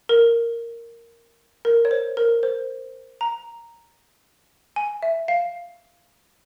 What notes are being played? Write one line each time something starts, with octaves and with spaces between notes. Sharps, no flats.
A#4
A#4
C#5
C5
A#4
C5
A#5
G#5
E5
F5